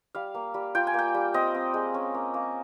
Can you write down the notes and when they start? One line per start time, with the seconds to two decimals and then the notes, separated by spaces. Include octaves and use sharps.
0.15 G3 F5
0.34 A#3
0.54 G3
0.75 F4 G5
0.87 G#5
0.94 A#3 G5
1.14 G3
1.34 C4 D#5
1.55 C4
1.74 G#3
1.94 C#4
2.14 A#3
2.34 A#3